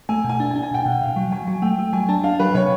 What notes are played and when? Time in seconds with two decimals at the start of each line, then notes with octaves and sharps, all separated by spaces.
0.09 A3 G#5
0.24 B2
0.29 G#5
0.40 D4
0.51 G#5
0.56 D4
0.63 G#5
0.71 B2 G5
0.86 B2 F#5
1.01 B2 F5
1.16 F#3
1.32 F#3 G#5
1.47 F#3 G#5
1.62 A3 G5
1.79 A3
1.93 F#3 G#5
2.09 D4 A5
2.24 D4 F5
2.39 F#3 B4
2.55 C3 C#5